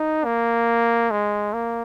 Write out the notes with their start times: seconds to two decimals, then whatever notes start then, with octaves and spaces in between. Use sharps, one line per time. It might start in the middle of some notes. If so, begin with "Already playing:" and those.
Already playing: D#4
0.24 A#3
1.11 G#3
1.53 A#3